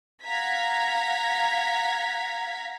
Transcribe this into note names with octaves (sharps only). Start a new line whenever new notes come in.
F5 F#5 A#5 G#6 B6